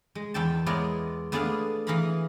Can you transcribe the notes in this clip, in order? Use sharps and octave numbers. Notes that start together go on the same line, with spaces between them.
G#3
E2 E5 G5 A5
G#3 B3 E4 A#4 C#5 D5
A3 B3 D4 G#4 D5 F5
E3 G#4 F5 A#5 B5